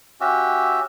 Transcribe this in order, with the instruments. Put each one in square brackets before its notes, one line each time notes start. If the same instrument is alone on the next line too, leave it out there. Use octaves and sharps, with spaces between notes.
[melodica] C#4 F#4 G4 E5